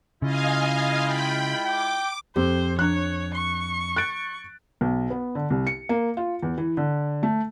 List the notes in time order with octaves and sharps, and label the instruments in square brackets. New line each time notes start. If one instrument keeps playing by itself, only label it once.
[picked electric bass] C#3 [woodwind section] G#3 E4 F4 [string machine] D#5 F5 G#5
[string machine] G5 B5
[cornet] G5 [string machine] D6
[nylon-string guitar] F2 [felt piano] C4 G4 [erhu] C5
[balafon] F3 D4 [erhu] C#5 [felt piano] F#6
[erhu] C#6
[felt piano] F#6 A6 D7
B1
B3
D3
C2
C#7
A#3
F4
E2
E3
D3
A3